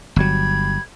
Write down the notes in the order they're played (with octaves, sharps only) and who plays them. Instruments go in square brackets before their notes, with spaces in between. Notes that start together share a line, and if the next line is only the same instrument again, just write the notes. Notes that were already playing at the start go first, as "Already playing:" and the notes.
[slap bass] G1 F#3 [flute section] G4 B5 G#6